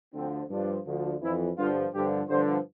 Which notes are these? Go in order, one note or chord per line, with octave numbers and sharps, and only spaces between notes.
D2 D3 F3 C4
G2 F3 D4
D2 D3 F3
F2 E3 E4
G2 D3 F3 F4
G2 D3 F3 G4
G2 D3 F3 C5